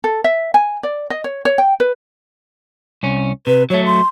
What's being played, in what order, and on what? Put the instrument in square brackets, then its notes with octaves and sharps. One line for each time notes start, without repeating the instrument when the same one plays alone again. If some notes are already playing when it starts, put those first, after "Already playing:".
[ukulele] A4
E5
G#5
D5
D#5
C#5
C#5
G5
B4
[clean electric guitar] C2 C#4
[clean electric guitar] C3 [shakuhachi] B4
[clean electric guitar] F#3 A3 [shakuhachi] C#5
[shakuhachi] C6